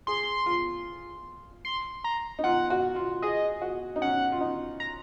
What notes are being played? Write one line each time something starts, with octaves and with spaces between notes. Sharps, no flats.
G#4 C6
F4
C6
A#5
D#4
F4 F#5
F#4
F4
G#4 D#5
F#4
D#4
C#4 F#5
F4
D#4
A#5